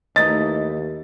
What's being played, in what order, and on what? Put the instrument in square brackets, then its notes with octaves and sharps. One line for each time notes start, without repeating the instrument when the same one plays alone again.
[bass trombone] D#2 [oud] E3 A3 D#4 [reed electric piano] D#5 [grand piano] A6